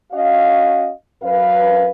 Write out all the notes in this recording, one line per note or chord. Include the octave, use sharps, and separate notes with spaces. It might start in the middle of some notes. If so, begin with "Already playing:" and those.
C#4 F#4 D#5 F5
F#2 B4 F5